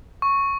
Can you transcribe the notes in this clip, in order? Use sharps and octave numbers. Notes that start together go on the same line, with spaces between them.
C#6